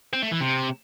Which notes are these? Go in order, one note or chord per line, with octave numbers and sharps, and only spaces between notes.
C4
A3
E3
C3